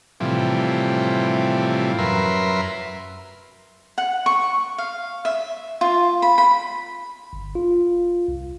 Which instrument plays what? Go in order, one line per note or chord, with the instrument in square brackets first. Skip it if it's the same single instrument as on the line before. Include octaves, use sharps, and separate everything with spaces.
[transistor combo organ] A2 C3 E3 F3 G3
F#2 A#4 B4 E5 C6
[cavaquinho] F#5
C#6
F5
E5
F4
B5
B5
[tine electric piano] G1
F4
C2